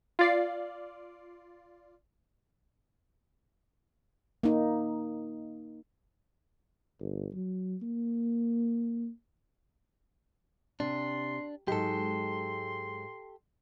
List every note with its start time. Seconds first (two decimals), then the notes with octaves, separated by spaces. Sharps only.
0.19 F4 D5 C7
4.43 A#3 D#4
7.00 G1
7.34 F#3
7.82 A#3
10.80 C3 D4 C6
11.68 G#2 F#3 G#3 G4 A4 C6